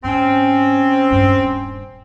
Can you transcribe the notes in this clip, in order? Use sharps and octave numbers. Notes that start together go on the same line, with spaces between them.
G#2 C4 C#4
D#1 G2